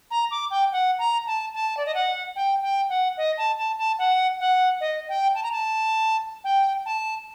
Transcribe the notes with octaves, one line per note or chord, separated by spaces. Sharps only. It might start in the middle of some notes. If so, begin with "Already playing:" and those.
A#5
D6
G5
F#5
A#5
A5
A5
D5
D#5
F#5
G5
G5
F#5
D#5
A5
A5
A5
F#5
F#5
D#5
G5
A5
A#5
A5
G5
A5